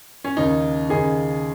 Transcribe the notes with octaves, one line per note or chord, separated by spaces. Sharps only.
C#4
D#2 C#3 D#4
D#2 C#3 D#4 G#4